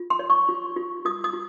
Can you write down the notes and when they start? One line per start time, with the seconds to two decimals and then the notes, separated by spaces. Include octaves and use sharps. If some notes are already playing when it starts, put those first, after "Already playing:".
Already playing: F4
0.10 C6
0.19 C#5
0.30 C#6
0.49 F4
0.76 F4
1.05 F4 D#6
1.24 D#6
1.33 F4